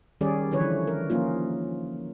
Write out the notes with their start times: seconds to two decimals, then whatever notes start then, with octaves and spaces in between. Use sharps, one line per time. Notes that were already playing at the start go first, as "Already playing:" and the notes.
0.21 D#3 G3 C#4 G#4 D5
0.52 D3 E3 F3 B4 C#5
0.87 A#4
1.10 F3 A#3 C#4 D#4 F4